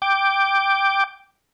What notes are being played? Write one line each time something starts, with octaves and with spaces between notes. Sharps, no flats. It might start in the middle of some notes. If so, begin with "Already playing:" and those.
G5 D6